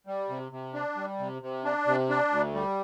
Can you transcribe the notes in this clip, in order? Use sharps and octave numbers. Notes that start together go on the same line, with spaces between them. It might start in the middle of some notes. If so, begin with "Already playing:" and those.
G3
C3
C3
D4
G3
C3
C3
D4
C3
D4
D2
G3